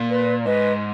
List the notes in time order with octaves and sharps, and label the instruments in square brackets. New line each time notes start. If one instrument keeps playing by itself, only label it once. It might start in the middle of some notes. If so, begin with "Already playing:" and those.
Already playing: [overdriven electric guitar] A#2
[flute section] B4
[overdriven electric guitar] G#2 [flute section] B4 D#5